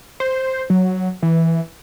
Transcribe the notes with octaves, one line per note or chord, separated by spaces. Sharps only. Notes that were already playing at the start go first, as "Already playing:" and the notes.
C5
F#3
E3